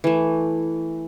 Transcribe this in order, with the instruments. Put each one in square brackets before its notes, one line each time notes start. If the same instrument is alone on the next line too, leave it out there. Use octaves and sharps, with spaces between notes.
[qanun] E3 A3